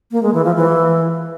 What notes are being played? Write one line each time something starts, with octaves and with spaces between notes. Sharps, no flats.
A#3
G#3
E3
F3
E3